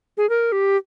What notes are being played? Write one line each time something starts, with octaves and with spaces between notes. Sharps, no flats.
G#4
A#4
G4